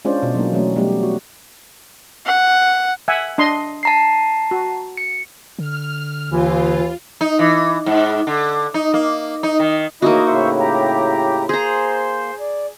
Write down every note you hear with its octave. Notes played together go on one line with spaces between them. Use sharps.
G#3 C#4 D4 F4 C5 D5
B2
F#3 A#3 D#4
E3 F#3 A3 C#4
F#3 G3 A3 B3 D#4 G4
F#4
F#5
E5 F#5 G#5
D4 D#5 C6
A5 A#5 C7
F#4
C#7
D3 F6
D#2 E3 F4
D#4
E3
G#2
D3
D#4
A#3
D#4
D#3
C#3 E3 A3 A#3 D#4 E4 F#4 D#5
A2 C#3 E4 C5 E5 C#6
G4 A#5
A#3 G#4 C5 A#5 C6
D5